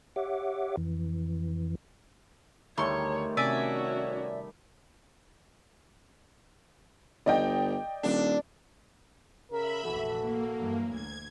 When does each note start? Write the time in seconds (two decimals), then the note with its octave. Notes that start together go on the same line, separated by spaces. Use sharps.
0.16 G4 C#5 E5 F#5 D6
0.77 F2 E3
2.78 D2 D#3 G3 A3 C#5 C6 C#6
3.37 C3 C#4 F#4 D5 E5 G#5
7.26 G1 D5 D#5 G5
8.03 D#1 D4
9.51 C#3 A#4 E5 B5
9.84 F1 A#1 E3 F#4 A4
10.20 A#3
10.57 G2 E3 F#3
10.89 D2 G#6